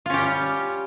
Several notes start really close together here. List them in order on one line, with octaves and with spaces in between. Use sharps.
F4 C#4 G4 G3